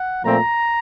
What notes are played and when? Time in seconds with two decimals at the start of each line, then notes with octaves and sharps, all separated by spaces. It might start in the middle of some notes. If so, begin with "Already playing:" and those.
Already playing: F#5
0.23 A#2 F3 A3 C4 A#5